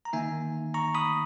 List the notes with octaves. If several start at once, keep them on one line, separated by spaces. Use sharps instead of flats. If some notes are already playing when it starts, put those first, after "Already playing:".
A#5
D#3 A#3 D#4 E5 G#5
A#5 C#6
B5 D#6